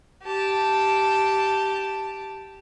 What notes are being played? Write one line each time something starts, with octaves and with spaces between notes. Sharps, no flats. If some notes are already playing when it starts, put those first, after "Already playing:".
G4 A5